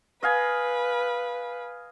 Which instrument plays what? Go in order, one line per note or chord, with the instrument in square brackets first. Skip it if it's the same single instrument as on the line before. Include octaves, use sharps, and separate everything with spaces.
[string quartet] B4 [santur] D#5 F5 G#5